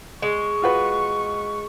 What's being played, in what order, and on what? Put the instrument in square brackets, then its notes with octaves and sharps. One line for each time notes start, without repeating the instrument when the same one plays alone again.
[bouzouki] G#3 [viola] C#6
[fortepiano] F4 F#4 B4